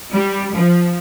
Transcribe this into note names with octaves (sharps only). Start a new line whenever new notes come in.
G3
F3